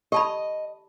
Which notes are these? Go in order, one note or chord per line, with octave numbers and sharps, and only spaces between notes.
G4 D#5 A5 B5